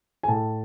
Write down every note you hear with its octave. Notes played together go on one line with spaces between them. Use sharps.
G#5
A2 A5